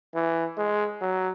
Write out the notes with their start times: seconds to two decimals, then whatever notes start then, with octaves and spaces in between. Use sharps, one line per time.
0.15 E3
0.57 G#3
1.01 F#3